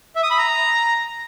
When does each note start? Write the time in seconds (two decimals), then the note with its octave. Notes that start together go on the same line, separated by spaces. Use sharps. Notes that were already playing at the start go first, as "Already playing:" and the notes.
0.16 E5
0.23 D#6
0.30 B5
0.38 A#5